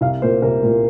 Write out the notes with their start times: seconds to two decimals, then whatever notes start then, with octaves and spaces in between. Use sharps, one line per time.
0.01 C2 F5
0.22 A#2 A#3 C5
0.42 C2 A#4
0.63 A#2 A#3